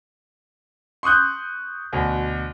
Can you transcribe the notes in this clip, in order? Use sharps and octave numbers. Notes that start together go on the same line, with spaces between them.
C6 C#6 D#6 F#6 G6
D2 B2